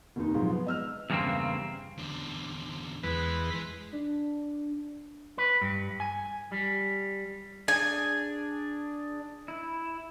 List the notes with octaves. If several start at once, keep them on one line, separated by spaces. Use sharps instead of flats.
F1 D#2 D#3 D#4
G#2 C3 F3 F#3 G#3
B3
D#5 E6 F6
E2 G2 C#3 G3 A#3 C4
E2 D3
E2 G#3 B4
D4
B4
G2
G#5
G3
D4 G#4 G#5
E4